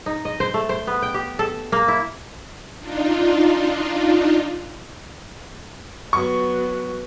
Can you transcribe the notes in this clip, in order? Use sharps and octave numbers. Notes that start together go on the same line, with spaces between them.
D#4
D#5
C5
A3
C5
B3
G5
G4
A4
A#3
E4
D4 D#4 F4
F#3 B3 C#6